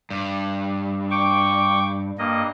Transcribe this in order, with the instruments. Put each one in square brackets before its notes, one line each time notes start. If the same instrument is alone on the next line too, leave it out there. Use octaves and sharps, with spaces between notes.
[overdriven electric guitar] G2
[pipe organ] G5 C#6 D6
G2 A#3 D#5